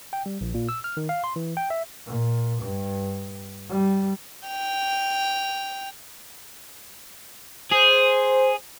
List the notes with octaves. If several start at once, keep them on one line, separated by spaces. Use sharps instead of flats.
G5
G3
A#1
A#2
E6
F6
D#3
F5
C6
E3
G5
E5
A#2
G2
G3
G5 F7
G#4 C5